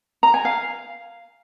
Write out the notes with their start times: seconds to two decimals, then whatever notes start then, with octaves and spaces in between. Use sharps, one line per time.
0.23 A#5
0.34 G#5
0.45 F5